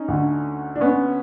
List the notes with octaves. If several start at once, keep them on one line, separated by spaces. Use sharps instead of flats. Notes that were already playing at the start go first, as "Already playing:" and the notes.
Already playing: C#4 D#4
D2 D3
D4
B3 C#4